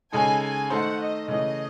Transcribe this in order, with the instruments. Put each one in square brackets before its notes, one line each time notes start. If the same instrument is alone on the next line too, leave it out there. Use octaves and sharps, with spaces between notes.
[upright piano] C#3 G#3 D#4 A4 [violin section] G#5
[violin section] G#5
[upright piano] D#3 A3 D#4 A4 C5 [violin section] F#5
[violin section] D#5
[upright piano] C#3 E3 A3 [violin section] D#5